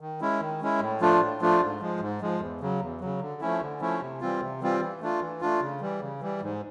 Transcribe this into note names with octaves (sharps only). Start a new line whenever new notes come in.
D#3
G#3 C#4 E4
D#3
G#3 C#4 E4
A2
F3 A3 D4 F4
A2
F3 A3 D4 F4
G#2
F3 G#3
G#2
F3 G#3
E2
C#3 F#3
E2
C#3 F#3
D3
F3 A3 C#4 E4
D3
F3 A3 C#4 E4
C3
E3 G3 C4 F4
C3
E3 G3 C4 F4
E3
A3 D4 F4
E3
A3 D4 F4
C#3
E3 G3
C#3
E3 G3
G#2